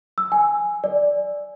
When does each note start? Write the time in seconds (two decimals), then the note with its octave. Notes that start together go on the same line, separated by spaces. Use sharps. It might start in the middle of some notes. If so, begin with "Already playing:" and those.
0.18 E6
0.32 G#5
0.84 D5